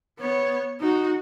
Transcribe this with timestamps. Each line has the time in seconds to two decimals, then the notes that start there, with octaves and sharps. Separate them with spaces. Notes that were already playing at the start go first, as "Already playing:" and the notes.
0.19 B3 C#5
0.80 D#4 F#4